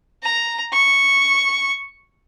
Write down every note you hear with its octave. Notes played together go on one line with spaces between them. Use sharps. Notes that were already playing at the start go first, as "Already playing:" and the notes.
A#5
C#6